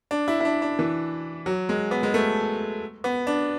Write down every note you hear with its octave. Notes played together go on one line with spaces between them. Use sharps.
D4
E4
E4
D4
D4
E3
F#3
G#3
B3
G#3
A3
B3
D4